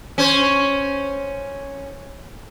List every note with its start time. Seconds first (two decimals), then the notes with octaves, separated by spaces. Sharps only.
0.18 C#4 C5